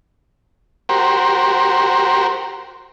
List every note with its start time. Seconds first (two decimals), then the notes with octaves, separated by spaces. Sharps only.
0.89 F#4 G4 A#4 C5